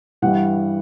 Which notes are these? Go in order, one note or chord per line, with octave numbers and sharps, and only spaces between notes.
G2 E3 G3 F#5